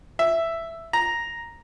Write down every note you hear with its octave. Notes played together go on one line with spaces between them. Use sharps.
E5
A#5